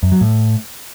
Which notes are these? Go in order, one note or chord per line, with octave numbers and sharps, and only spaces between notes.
F#2
F#3
A2